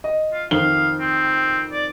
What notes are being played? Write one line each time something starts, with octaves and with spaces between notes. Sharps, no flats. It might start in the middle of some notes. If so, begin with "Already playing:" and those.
D#5
F4
F2 D#3 F5 G7
C4
D5